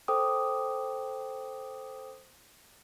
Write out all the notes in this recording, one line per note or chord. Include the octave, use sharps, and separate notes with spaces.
A4 C5 G5 D6 D#6